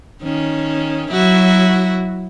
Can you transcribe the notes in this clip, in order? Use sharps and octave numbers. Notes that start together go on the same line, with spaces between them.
D#3 C#4
F#3 E4 F#4